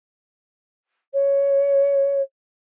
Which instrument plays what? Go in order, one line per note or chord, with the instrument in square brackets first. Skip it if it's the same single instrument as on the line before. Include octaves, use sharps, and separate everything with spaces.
[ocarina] C#5